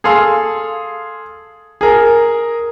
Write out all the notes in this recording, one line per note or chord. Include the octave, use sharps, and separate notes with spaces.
G#4 A4 F5 C6
G#4 A#4